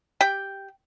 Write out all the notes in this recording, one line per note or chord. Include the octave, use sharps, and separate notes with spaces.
G4 G5